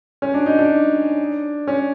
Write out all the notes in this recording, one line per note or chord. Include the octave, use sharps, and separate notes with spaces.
C#4
D4
D#4
D4
C#4